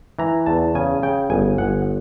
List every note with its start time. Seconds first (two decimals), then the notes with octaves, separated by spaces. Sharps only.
0.19 E3 A#5
0.46 E2 A5
0.75 C#3 G#5
1.03 C#3 G5
1.30 G1 G#5
1.58 G1 F#5